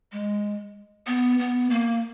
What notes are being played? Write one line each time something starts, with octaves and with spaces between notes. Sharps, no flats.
G#3
B3
B3
A#3